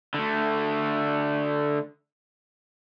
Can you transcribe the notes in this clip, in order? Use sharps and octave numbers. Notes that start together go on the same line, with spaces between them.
D3 A3